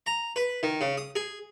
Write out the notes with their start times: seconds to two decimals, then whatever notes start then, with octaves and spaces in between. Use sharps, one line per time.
0.06 A#5
0.36 B4
0.63 D#3
0.81 C#3
0.97 D#6
1.16 G#4